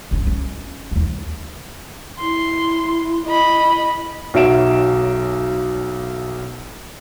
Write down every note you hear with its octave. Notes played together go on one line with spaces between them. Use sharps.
G1 C#4
C#4 F4
D#2 E3
E4 C6
D#5 B5
B1 F#3 E5 D7 E7